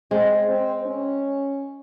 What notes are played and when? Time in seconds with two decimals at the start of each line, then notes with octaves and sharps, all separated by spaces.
0.11 G#3 C4
0.49 C4
0.86 C#4